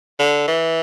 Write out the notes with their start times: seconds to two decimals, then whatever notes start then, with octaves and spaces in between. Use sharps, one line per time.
0.19 D3
0.47 E3